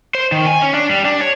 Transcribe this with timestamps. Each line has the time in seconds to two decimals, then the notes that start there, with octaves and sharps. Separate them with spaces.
0.15 C5
0.32 D#3
0.47 G#5
0.62 C#4
0.74 D4
0.90 G3
1.05 D4
1.21 C#5